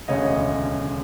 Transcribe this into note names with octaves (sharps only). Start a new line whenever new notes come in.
E1 D2 C#3 C#5 D#5